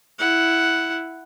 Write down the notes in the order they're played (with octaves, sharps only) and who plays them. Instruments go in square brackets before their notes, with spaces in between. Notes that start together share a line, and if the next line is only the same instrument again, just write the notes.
[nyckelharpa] E4 F#5